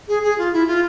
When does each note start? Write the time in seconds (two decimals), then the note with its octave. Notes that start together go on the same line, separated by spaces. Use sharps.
0.08 G#4
0.23 G#4
0.38 F4
0.53 E4
0.67 F4